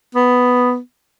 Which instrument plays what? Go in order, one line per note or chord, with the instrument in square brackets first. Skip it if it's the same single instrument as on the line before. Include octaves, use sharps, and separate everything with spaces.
[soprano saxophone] B3